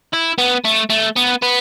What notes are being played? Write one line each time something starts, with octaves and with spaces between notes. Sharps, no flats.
E4
B3
A3
A3
B3
B3